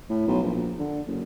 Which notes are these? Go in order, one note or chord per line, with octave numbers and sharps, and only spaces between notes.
A2
B1
A#1
D3
F#1